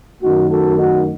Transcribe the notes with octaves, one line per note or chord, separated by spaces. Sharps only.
F#2 D#3 A3 D#4 F#4
F#4 A4
D#4 F#4